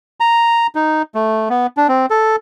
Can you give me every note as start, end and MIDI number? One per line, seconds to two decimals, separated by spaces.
0.20 0.67 82
0.75 1.02 63
1.15 1.49 57
1.50 1.67 59
1.77 1.87 62
1.88 2.06 60
2.10 2.36 69